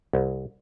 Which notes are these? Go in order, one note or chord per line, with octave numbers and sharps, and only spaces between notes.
C2